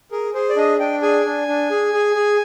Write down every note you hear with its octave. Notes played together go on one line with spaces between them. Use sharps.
G#4 A#4
G#4 C5
D5
D4 D#5
D4 G5
G#4 G#5
D4
D4
G#4
G#4
G#4